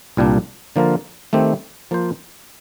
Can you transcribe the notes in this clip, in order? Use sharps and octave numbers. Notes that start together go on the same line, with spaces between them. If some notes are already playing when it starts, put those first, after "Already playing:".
C2 A#2 G3 A#3 D4
D3 F3 A#3 F4 A#4
D#3 A3 C4 G4
F3 A#3 F4 C5